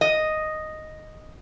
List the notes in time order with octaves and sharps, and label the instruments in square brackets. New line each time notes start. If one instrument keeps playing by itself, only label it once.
[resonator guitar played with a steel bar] D#5